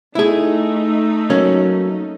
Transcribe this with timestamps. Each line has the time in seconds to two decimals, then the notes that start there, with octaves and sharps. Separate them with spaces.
0.15 A3 D#4 E4 G#4
1.30 F#3 A#3 C#4